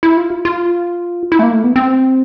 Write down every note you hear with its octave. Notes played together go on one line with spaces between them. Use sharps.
E4
F4
F4
E4
A3
A#3
A3
B3
C4